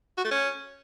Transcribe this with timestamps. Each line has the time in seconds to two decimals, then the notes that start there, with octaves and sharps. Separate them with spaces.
0.18 F#4
0.24 A3
0.31 C#4